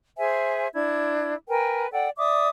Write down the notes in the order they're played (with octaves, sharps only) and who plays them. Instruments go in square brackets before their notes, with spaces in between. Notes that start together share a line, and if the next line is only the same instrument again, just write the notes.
[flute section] G#4 C5 E5 G#5
D4 E4 G#6
A#4 B4 G5 G#5
A4 D5 F#5 G5
D5 E5 D6 D#6